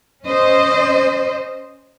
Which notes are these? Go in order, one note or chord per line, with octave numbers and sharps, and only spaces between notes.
C#4 C5 D#5